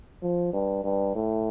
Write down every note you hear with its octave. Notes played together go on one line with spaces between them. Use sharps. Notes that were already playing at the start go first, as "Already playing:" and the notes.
F3
G2
G2
A2